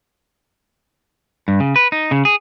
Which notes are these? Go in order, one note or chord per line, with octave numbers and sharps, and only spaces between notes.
G2
C#3
B4
D#4
C#3
G#4